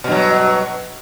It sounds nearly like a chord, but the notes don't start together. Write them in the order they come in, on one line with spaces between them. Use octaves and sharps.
B2 G2 F#3